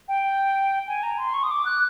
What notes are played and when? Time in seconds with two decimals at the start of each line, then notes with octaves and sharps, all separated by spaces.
0.08 G5
0.88 G#5
1.03 A#5
1.18 C6
1.34 C#6
1.44 D#6
1.51 D6
1.65 F#6